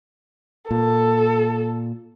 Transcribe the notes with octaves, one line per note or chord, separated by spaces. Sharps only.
A#2 A4